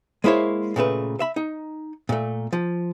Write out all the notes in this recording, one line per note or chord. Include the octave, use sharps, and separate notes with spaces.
G#3 A#3 E4 C5 C#5
A#2 C#3 A3 B4
E5 B5
D#4
A#2 A3
F3